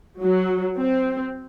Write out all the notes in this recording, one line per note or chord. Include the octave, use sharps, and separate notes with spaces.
F#3
C4